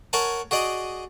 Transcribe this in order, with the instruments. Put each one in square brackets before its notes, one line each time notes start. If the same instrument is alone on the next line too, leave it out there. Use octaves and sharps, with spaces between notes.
[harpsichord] A#4 C#5 F#5 G#5 A5
F#4 G#4 D5 D#5